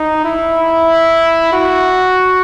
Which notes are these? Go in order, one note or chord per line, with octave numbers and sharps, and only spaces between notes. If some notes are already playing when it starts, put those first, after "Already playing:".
Already playing: D#4
E4
F#4